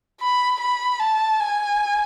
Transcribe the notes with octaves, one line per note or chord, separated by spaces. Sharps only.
B5
B5
A5
G#5